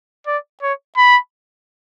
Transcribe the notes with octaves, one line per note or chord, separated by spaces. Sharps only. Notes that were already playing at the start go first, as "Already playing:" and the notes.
D5
C#5
B5